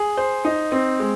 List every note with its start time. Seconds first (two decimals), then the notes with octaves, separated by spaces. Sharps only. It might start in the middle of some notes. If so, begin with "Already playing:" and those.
Already playing: G#4
0.17 C5
0.45 D#4
0.72 C4
1.00 G#3